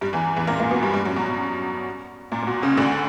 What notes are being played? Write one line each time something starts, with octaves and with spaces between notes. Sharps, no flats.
G2 G3
E2 E3
E2 E3
A#2 A#3
A#2 A#3
B2 B3
G2 G3
G2 G3
F#2 F#3
B2
B2
A#2
A#2
B2
C#2 C#3
D2 D3